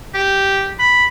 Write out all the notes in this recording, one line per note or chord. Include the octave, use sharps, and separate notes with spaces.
G4
B5